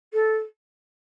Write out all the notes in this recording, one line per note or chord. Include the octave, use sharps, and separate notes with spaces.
A4